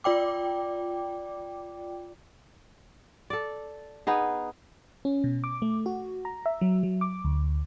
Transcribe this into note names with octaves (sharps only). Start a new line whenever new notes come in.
F4 D5 G5 D6
A4 D5
B3 D#4 G#4
C#4
B2
D6
A3
F#4
A#5
E5
F#3
F#3
D6
D2